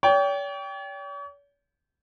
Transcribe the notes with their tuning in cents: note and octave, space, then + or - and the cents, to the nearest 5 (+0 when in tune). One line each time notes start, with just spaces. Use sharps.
C#5 +45 G5 +0